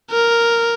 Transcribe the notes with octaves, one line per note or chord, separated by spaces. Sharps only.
A#4